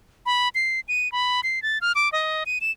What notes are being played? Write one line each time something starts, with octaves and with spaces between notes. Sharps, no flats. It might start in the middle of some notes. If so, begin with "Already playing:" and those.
B5
C7
D#7
B5
C7
A6
F6
D6
D#5
D#7
E7